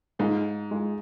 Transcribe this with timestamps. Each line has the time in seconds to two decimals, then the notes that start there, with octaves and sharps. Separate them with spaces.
0.19 G#2 G#3 F4 G#4
0.71 G#3 F4 G#4